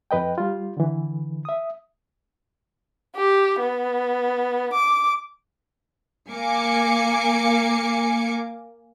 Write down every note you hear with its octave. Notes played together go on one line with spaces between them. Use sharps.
F2 B4 D#5 G5
G3 F4
D3 E3
E5 D#6
G4
B3
D6
A#3 G#5 D6 C#7